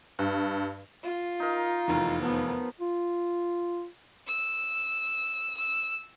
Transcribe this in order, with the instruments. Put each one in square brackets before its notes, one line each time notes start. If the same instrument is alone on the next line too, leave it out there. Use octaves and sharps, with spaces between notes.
[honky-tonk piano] G2
[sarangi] F4
[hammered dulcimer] D#4 A#4
[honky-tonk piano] F1 E2 D#3
[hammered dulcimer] F3 [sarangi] B3
[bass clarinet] F4
[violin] E6
E6